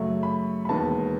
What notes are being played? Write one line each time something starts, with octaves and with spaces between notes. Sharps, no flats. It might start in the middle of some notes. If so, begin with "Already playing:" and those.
Already playing: F#2 C#3 F#3 A3
B5
B5
E1 D#2 D#3 G#3 B3 A5